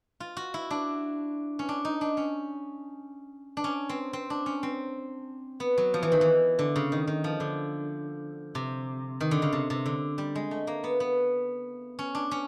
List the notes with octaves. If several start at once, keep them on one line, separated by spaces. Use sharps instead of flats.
F4
F#4
E4
D4
C#4
D4
D#4
D4
C#4
D4
C#4
C4
C4
D4
C#4
C4
B3
F#3
F3
E3
D#3
E3
D3
C#3
D#3
D#3
F3
D3
C3
D#3
D3
C#3
C3
C3
D3
G3
G#3
A3
A#3
B3
B3
C#4
D4
C#4